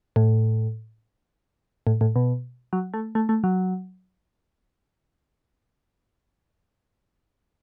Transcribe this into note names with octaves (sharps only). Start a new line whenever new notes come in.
A2
A2
A2
B2
F#3
A3
A3
A3
F#3